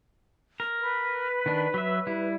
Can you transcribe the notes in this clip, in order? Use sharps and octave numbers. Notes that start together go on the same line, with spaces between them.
A#4
B4
D#3 D4
F#3 E5
G3 E4